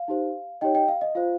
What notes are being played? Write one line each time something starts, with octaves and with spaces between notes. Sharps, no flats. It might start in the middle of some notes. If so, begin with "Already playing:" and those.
Already playing: F5
D#4 G4 C5
D#4 G4 C#5 D#5 G5
D#5 G5
F5
D#5
F4 C5 F5